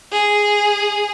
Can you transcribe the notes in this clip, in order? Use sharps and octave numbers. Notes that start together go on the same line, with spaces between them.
G#4